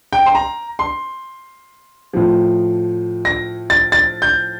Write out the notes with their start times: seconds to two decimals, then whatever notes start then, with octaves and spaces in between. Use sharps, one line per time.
0.13 G5
0.26 C6
0.35 A#5
0.79 C6
2.13 A2 F3
3.25 A#6
3.70 A6
3.92 A6
4.22 G6